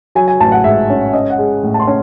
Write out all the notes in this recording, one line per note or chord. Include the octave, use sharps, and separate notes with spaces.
F#3 G#5
G#5
A1 A5
F#5
G#2 E5
C#4
C#4 D#5
F#5
G#3
A2
A5
C6
C#4